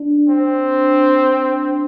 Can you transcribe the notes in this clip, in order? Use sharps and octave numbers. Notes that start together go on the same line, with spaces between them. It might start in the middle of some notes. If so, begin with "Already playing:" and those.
Already playing: D4
C4